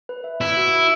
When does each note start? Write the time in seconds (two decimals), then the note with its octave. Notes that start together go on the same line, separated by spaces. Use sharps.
0.09 B4
0.24 E5
0.41 E4 E5
0.57 F#4
0.72 E5